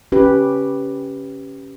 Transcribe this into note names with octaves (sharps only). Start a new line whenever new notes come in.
C#4 G4 B4